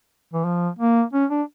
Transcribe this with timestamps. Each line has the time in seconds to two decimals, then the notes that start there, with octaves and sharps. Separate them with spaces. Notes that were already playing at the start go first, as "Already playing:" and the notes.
0.34 E3
0.45 F3
0.79 A#3
1.13 C#4
1.30 D4